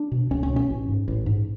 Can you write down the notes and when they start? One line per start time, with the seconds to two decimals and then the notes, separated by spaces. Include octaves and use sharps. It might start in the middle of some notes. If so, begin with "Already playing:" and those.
Already playing: D4
0.12 B2
0.31 C#2 C#4
0.43 C#4
0.50 B2
0.56 C#4
0.69 A1
0.88 G#2
1.08 A1
1.26 G#2